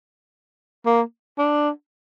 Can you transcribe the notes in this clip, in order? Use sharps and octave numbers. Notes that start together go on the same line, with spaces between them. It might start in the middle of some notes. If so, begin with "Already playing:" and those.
A#3
D4